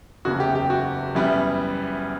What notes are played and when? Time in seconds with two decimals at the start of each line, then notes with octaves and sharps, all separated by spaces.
0.25 F#1 E2 C#3 F#4
0.40 G4
0.55 G4
0.70 F#4
1.15 F#2 E3 G3 B3